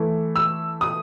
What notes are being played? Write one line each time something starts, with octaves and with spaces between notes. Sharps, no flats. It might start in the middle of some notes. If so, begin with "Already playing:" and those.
Already playing: E3 A3 E4
E6
D#6